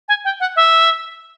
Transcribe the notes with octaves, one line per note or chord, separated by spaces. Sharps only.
G#5
G5
F#5
E5